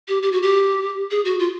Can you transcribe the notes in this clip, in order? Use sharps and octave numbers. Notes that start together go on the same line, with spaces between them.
G4
G4
F#4
G4
G#4
F#4
F4